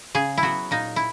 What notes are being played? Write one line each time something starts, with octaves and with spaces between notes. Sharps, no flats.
C#3 G#4
E4
F#3 B3 F#4
A#2 D#4
E4